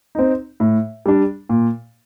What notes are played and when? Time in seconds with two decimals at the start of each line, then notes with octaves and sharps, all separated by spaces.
0.15 C4 D#4
0.60 A2
1.06 G3 D4
1.49 A#2